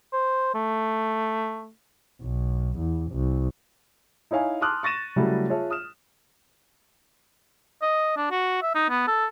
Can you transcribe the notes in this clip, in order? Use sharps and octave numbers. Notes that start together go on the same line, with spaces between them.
C5
A3
B1
E2
C2
D#4 E4 C#5 F5 G#5
A5 C6 D6 D#6 F6 F#6
C#6 A6 A#6 D#7 E7
C#3 F#3 G3 A3 E4
F4 G#4 C#5 E5 A5
D#6 F6 E7
D#5
D4
F#4
E5
D#4
B3
A4